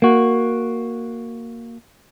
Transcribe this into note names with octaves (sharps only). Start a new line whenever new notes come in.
A#3 F#4